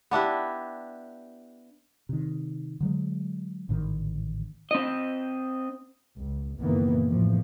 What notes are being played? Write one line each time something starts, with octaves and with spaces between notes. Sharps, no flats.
B3 D4 E4 G4
C3 D#3
D3 F#3 G#3
A1 G#2 D3 D#3
C4 D#5
C#2
F#1 A#2 D#3 E3 A#3 B3
A1 E2 A2 F3